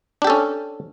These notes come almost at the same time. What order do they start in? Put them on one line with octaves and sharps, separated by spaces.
D4 G4 A4 C#4